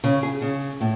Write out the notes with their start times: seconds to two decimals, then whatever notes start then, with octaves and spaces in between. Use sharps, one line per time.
0.04 C#3
0.23 G#4
0.42 C#3
0.81 A2